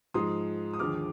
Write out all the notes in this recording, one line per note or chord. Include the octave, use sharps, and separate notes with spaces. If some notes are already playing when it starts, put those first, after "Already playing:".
G#2 F3 G#3 C6 D#6
D#6
D#2 D3 F3 G#3 D6 F6